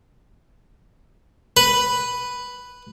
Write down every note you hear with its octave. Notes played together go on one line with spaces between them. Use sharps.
B4